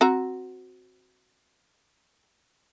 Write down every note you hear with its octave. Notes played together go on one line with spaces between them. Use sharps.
C4 F#4 A#5